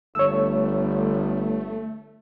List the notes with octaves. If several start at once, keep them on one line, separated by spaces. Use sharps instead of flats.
G1 A3 C#5 E6